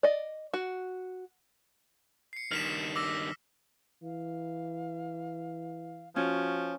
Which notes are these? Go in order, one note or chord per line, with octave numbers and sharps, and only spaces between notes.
D5 D#5
F#4
C7 C#7
G2 D#3 F6 B6 E7
D6 E6 A#6
E3 F5
F3 C#4 F#4